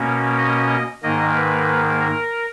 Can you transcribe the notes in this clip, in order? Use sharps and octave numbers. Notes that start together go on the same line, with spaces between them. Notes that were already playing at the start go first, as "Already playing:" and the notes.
Already playing: B2 A#3 C#4
D#5
G#2 D#3 A#3 D#5
B4
A#4